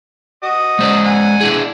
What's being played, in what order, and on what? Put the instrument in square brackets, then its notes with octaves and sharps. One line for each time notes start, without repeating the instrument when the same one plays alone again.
[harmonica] F#4 D#5
[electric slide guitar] G#3 C5 D5
[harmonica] F#5 G#5
[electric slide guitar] D4 E4 G#4